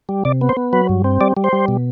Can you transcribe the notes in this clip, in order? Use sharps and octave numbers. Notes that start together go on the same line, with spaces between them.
G3
C3 D5
B3
C5
B3
F#3 B4
G2
C4
G3 D5
G3
C5
G3
B2